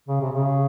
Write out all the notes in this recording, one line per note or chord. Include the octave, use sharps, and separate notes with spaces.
C#3
C3
C#3